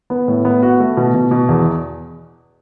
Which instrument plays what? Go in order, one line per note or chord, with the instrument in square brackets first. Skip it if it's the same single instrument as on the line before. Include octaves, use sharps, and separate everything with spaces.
[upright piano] B3
A2
B3
F#4
A3
B2
B2
B2
E2